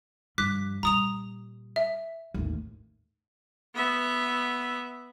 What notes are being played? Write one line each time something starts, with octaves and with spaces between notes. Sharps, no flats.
G2 F3 D6 F#6 B6
A#2 G3 A#5 D#6 F7
E5
A1 D#2
B3 E5